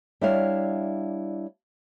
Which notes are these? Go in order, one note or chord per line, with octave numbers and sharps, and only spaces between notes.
G3 D4 E4 C#5 E5 F5